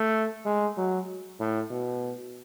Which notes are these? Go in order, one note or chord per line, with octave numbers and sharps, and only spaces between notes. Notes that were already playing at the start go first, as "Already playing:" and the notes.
Already playing: A3
G#3
F#3
A2
B2